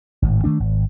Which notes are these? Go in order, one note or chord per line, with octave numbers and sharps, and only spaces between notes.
G#1 A2
D#3 A3 D4
G#1